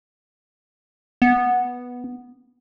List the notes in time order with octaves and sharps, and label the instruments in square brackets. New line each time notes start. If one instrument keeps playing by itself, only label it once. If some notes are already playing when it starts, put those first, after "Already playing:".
[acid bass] B3